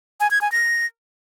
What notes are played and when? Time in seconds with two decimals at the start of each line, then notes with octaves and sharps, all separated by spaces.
0.20 G#5
0.31 G#6
0.41 G#5
0.52 A#6